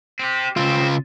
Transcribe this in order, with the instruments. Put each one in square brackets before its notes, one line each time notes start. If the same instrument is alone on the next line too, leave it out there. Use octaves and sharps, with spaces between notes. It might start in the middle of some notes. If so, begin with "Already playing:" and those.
[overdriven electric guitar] C4 G4
[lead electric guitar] C#3 F4 [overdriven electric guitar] C4